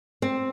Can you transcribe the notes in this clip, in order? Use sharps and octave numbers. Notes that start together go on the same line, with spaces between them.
C4